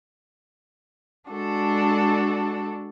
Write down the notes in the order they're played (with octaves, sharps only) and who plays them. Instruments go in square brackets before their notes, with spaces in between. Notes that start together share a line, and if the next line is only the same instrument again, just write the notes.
[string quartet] G#3 D4 F#4 A4